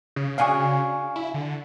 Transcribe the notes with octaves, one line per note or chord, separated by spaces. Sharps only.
C#3
D4 F#4 G#4 F5 G#5 C#6
E4
D3